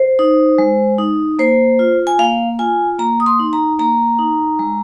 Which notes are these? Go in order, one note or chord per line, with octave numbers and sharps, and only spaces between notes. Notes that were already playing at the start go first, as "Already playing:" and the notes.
Already playing: C5
D#4
G#3
D#4
A#3 C5
F4
G#5
A#3 F5
F4 G#5
A#3 A#5
D#6
C6
D#4
A#5
A#3 A#5
D#4
G#3